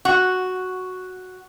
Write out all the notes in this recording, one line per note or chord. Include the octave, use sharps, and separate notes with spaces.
F#4